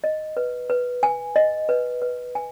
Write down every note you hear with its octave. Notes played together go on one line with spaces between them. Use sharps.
D#5
B4
B4
G#5
D#5
B4
B4
G#5